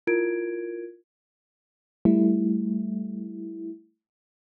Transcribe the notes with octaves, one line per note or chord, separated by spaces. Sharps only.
E4 F4 A#4 G#6 D7
G3 A3 E4